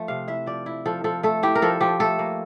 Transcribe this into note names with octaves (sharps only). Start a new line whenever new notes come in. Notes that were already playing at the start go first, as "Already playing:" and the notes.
Already playing: F3 A3
C3 F5
E4 E5
F3 D5
E4
F3 A4
F3 A4
A3 A4
E4 G4
A#4
F3 A4
F3 G4
A3 A4
A#3